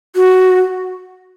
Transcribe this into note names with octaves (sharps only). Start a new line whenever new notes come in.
F#4